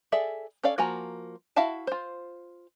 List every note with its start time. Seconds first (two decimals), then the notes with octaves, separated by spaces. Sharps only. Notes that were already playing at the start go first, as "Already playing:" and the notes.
0.12 G#4 A4 D5 E5
0.63 C#4 A4 C#5 D5 F5
0.78 F3 A#3 F#4 G#5 A#5
1.56 E4 F#4 E5 F5 A5
1.87 F4 C5